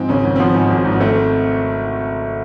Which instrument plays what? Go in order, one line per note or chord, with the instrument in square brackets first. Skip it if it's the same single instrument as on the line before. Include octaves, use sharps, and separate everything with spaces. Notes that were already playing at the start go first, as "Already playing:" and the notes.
Already playing: [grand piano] G#2 F3 [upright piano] C4
[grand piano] G#1 [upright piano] C#3 C#4
[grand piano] G#1
[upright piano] C4
[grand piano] F3 [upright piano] B3
[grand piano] G#2
G#1
G#1
[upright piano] B3
[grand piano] A3 [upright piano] C4